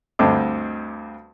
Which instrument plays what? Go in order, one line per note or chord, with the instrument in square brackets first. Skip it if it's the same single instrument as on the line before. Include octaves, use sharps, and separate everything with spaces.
[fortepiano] D2 G2 D3 C4 D#5 D6